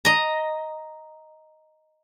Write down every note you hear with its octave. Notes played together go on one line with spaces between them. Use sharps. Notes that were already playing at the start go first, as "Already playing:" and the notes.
D#5 A#5